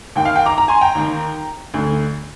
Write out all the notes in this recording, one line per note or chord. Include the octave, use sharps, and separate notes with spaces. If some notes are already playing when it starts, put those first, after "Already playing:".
D#2 D#3 G5
F5
G5
A#5 D6
A#5
G#5 C6
G5 A#5
D#2 D#3
D2 D3